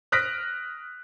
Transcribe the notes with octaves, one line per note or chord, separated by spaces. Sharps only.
D#6 F6 F#6 A#6 B6 D7